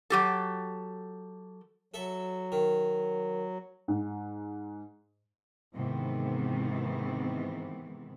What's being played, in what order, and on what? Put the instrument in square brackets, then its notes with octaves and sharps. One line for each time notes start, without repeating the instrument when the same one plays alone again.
[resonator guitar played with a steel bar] F#3 G4 A4
[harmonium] F#3 [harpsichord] A4 E5
[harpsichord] D#3
[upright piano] G#2
[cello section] G#2 C3 D#3 E3 B3